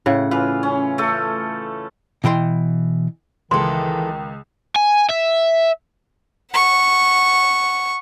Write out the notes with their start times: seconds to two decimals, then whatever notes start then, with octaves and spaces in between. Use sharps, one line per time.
0.06 A2 C#3 F#5
0.31 E3 F4 B4 F5
0.63 C#4
0.98 A3 A4
2.24 B2 E3 G5 C6
3.51 C#2 D#3 E3 A4 C6
4.76 G#5
5.10 E5
6.52 F#5 C#6